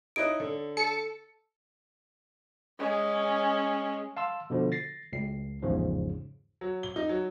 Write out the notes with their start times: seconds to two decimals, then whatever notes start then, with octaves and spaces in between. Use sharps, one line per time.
0.16 D#4 E4 C#5 D#5 D7
0.40 D3
0.77 A4 C#7
2.79 G#3 C#4
4.17 F5 A5 C6 E6
4.50 B2 D3 F3
4.72 A6 A#6 C7
5.13 C#2 C7
5.63 A1 E2 G#2 C#3 F3
6.61 F#3
6.83 G7
6.96 D#4
7.09 F#3